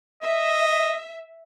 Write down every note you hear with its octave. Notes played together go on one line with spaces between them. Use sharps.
D#5 E5